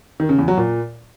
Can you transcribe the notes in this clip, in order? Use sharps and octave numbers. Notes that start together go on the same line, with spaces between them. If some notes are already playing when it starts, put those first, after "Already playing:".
D#3
C#3
E2
F#3
A#2